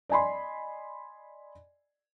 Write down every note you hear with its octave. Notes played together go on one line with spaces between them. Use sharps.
D5 D#5 G#5 B5 C6